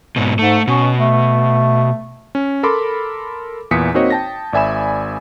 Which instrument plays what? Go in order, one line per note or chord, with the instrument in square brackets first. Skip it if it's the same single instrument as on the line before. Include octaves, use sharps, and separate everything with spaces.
[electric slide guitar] G#2 B2
[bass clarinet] G#2 [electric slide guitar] A3
[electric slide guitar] B2 [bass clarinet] C#4
[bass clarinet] A3
[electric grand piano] C#4
A4 A#4 B5 C6 D6
E2 A#2 E3 D#6 B6 C#7
A#3 C4 D#4 F#4 C#5 D#5
G5 A5 A#6
G#1 D5 E5 G#5 B5 E7